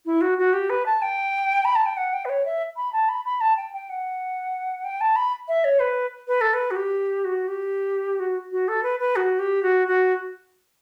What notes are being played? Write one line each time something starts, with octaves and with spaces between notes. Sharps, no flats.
E4
F#4
F#4
G4
B4
A5
G5
B5
A5
G5
F#5
G5
B4
C#5
E5
B5
A5
B5
B5
A5
G5
G5
F#5
G5
A5
B5
E5
C#5
B4
B4
A4
B4
F#4
G4
F#4
G4
F#4
F#4
A4
B4
B4
F#4
G4
F#4
F#4